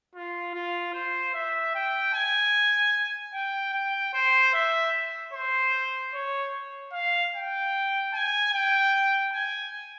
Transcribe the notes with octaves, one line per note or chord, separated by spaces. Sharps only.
F4
F4
C5
E5
G5
G#5
G5
G5
C5
E5
C5
C#5
F5
G5
G#5
G5
G#5